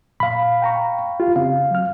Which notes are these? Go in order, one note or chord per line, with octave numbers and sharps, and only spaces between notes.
A#2 F5 B5
G5 A#5 C#6
F4 G4
C#3 C4 F5
F#3 F6